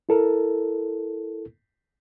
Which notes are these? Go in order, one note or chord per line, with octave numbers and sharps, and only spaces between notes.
E4 A4 A#4